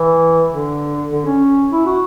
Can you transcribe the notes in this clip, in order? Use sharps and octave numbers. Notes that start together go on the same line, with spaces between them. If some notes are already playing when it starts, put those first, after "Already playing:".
Already playing: E3
D3
D3
C#4
E4
F#4